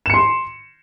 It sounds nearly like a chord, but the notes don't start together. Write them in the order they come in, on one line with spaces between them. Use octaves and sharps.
E7 C#7 C6